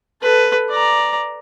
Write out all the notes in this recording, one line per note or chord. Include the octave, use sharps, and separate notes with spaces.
A4 B4
D5 A#5